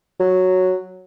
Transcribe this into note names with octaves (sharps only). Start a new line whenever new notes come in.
F#3